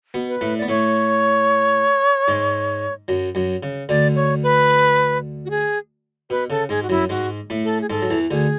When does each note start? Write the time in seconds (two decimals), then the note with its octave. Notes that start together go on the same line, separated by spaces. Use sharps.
0.14 B2 B3
0.28 B4
0.41 A2 A3
0.58 B3 D5
0.68 A2 A3 C#5
2.28 G#2 G#3
3.08 F#2 F#3
3.35 F#2 F#3
3.63 C#3
3.89 D2 D3 D5
4.16 C#5
4.43 B4
5.45 F#4
5.50 G#4
6.30 B2 B4
6.50 C#3 A4
6.69 G#2 G#3 G#4
6.83 F#4
6.89 F#2 F#3 E4
7.09 G#2 G#3 F#4
7.50 A2 A3
7.64 A4
7.81 G#4
7.90 G#2 G#3 A4
8.02 F#3
8.10 E2 E3
8.31 D2 D3 G#4